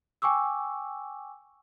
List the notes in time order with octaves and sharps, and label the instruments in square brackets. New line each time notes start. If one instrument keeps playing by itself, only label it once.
[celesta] G5 G#5 C#6 D6 E6